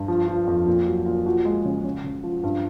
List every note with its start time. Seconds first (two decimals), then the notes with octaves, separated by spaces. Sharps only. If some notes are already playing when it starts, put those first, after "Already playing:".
Already playing: G2
0.08 F3
0.28 F3
0.47 F2
0.66 A#2
0.87 F#3
1.06 A#2
1.26 F3 F#4
1.45 G#3
1.65 C#3
1.84 C#3
2.04 C#3
2.24 F3
2.43 G2